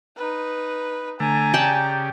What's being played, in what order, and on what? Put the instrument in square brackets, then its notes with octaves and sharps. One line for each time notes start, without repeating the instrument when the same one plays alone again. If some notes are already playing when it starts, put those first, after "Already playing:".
[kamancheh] D#4 B4
[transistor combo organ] D3 A3 [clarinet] G#5 [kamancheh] A#5
[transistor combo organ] C#3 G4 [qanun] D5 G5 A5